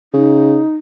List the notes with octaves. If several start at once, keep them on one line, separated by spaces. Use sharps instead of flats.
C#3 D#4